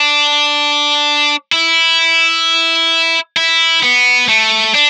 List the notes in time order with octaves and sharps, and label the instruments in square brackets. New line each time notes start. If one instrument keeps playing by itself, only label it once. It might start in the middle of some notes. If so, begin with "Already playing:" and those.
Already playing: [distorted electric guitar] D4
E4
E4
B3
A3
D4